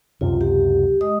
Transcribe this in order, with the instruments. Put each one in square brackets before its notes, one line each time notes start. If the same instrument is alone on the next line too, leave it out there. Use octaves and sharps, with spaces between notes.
[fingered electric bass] C#2 F#2 C3 [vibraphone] F4
[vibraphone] G4
G#3 D#5 D#6